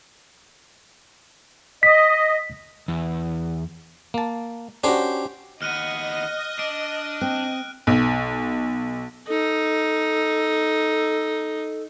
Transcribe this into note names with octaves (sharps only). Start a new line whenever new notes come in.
D#5 B6
E2
A#3 A5
C#4 D4 F#4 G4 C5
D#2 B3 D#5 F6 F#6 D#7
D4 D7
C4 F#6
B1
D#4 A4